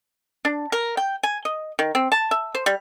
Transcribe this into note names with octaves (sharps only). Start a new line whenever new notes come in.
D4
A#4
G5
G#5
D#5
D#3
C4
A5
E5
C5
G3